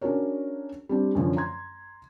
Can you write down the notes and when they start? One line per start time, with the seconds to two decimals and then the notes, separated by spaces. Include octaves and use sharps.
0.01 C#4 D4 F#4 G#4 A#4 C#5
0.89 G3 C4 D4
1.15 F#2 D3 F3 C#4
1.37 A#5 C6 G#6